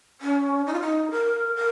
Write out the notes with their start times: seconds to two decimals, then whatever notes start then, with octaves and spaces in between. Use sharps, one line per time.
0.21 C#4
0.66 D#4
0.73 F4
0.80 D#4
1.11 A#4
1.56 A#4